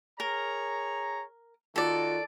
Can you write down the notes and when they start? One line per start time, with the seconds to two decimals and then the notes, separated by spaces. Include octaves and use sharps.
0.20 G#4 A#4 C#5 A#5
1.76 D#3 A#3 F4 F#4 A4 D5